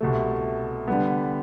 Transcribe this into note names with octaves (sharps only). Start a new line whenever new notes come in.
C2 B2 A3
D3 G3 B3